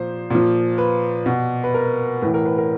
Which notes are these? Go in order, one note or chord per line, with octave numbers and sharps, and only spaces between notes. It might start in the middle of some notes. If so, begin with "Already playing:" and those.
Already playing: A#2 F3 C5
A#2 F3
B4
B2
B4
A#4
A2 E3 B4
A#4
B4
A#4